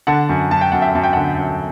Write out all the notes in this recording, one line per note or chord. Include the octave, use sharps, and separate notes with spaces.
D3 F#5 A5
F#2
F#2 A5
G5
F#2 F#5
E5 G5
F#2 A5
G5
D3 F#5 A5
F#2